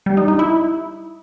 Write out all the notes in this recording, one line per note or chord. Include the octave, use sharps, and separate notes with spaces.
G3
D#4
D#4
E4